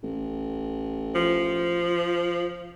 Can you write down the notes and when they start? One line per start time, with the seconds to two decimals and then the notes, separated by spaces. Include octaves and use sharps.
0.03 A1
1.15 F3